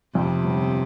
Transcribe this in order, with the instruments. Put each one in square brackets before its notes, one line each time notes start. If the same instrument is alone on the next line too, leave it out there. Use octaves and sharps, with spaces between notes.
[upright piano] F2 [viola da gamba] C3
[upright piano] G1